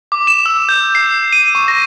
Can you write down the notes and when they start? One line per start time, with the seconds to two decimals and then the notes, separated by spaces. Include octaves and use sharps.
0.12 D6
0.27 E7
0.46 E6
0.69 G6
0.95 C7
1.33 D#7
1.55 C#6
1.68 A#6